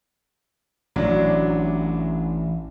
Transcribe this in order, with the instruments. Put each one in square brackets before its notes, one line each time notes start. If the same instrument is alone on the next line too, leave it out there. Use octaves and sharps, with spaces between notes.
[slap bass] A1 [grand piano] F#3 D4